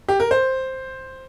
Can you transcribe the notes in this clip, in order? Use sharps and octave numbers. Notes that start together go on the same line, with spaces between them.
G4
A#4
C5